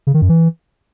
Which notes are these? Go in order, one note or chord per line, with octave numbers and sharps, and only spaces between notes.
C#3
D#3
F#2
E3